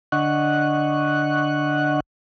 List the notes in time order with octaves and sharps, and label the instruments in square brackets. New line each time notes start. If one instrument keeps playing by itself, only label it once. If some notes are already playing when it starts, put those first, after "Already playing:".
[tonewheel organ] D3 D4 D#5 F#5 C#6 F#6